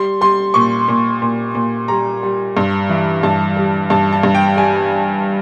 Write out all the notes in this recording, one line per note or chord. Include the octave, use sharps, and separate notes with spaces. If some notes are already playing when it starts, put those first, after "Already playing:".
Already playing: G3 C6
G3 C6
A#2 C#6
A#2
A#2
A#2
G3 A#5
G3
G2
E3
G2 A5
G3
G2 A5
A5
G2
G5
G3 G#5